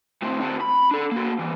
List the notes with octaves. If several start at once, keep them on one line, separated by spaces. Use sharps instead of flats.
A2 C4
C4 F#4
B5
D4 A4
A#3 F#4
E3 G3